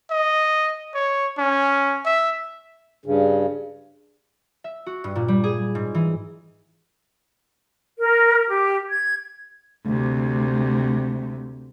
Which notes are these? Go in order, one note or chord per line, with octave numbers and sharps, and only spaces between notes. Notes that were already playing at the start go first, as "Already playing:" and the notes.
D#5
C#5
C#4
E5
G2 C#3
E5
F#4
G2
A#2
G3
G#4
G#2
E3
A#4
G4
G#6
D2 C3